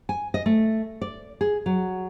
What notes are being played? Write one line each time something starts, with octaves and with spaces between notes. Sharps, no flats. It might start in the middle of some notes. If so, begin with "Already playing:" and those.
G#5
D#5
A3
D5
G#4
F#3